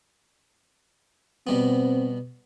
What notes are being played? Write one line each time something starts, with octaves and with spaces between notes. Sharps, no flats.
B2 G3 B3 C4